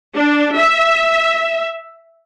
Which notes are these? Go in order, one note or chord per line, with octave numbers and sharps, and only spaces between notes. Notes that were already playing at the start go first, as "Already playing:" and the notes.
D4
E5